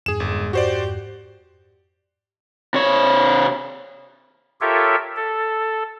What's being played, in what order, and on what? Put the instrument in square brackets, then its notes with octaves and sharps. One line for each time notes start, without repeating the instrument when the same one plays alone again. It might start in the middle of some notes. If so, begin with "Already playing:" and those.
[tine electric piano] F2 G#2 [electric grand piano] G#4 E7
[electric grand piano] G1 [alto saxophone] G#3
[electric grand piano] F#4 C5 D5 [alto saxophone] G4
[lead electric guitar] C3 C#5
[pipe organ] F4 G4 A4 A#4 C#5 E5
A4